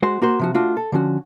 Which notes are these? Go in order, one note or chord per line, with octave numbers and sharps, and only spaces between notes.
G#3 F#4 C5
A#3 F#4 C5
C3 F3 F#4
A3 D4 F4 F#4
A4
D3 F3 C#4 F#4